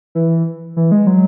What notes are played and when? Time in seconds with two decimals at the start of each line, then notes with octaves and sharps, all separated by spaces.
0.15 E3
0.76 E3
0.92 G#3
1.07 F#3